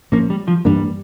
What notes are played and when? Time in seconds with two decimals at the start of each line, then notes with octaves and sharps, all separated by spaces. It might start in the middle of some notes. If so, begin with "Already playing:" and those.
0.12 A#2 F3 A#3 C#4
0.30 G3
0.48 F3
0.65 G2 E3 G3 A#3 D4